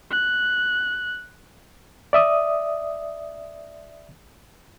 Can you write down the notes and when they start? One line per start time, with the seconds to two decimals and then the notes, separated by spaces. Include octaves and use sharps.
0.11 F#6
2.13 D5 E5 D#6